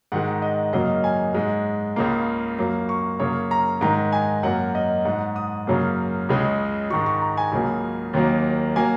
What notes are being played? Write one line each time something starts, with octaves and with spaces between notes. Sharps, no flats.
G#2 D#3 G#3 F#5
D#5
F#2 C#3 F#3 A#3 D#5
G#5
G#2 G#3
C#2 C#3 A#3
F#2 F#3 A#3
C#6
F#2 C#3 A#3 C#5
A#5
G#2 D#3 G#3 A#5
G#5
F#2 F#3 A#3 F#5
D#5
G#2 G#3 F#5
D#6
F#2 C#3 F#3 A#3
C#2 C#3 G#3
G#2 D#3 G#3 C#6
C#6
A#5
G#5
C#2 C#3 F#3 A#3
D#2 D#3 F#3 A#3
F#3 A#3 G#5